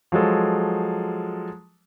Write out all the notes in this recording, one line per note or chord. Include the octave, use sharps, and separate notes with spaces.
F3 F#3 G#3 A4